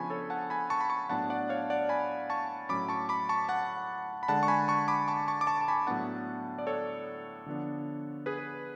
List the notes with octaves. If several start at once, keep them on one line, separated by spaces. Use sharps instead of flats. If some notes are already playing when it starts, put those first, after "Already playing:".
Already playing: C#3 F3 B3 D4 G#5 A5 B5 C#6
A4 C#5
F#5 A5
G#5 B5
A5 C#6
B5
A5 C#6
A2 F#3 B3 D4 F#5 A5
D5 F#5
C#5 F5
D5 F#5
G#5 B5
A5 C#6
A2 F#3 C#4 B5 D6
A5 C#6
B5 D6
A5 C#6
F#5 A5
B5
D3 G#3 D4 F#5 A5
C#6
G#5 B5
A5 C#6
B5 D6
A5 C#6
A5 C#6
D6
A5 C#6
A5
G#5 B5
A2 F#3 B3 D4 F#5 A5
D5
A4 C#5
D3 F3 B3 D4
G#4 B4